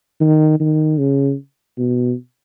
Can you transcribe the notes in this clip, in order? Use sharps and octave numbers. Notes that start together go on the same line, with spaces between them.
D#3
D#3
C#3
B2